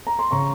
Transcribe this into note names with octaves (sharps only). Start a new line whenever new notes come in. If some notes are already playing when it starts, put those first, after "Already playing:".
A#5
C6
C#3 A#5 C#6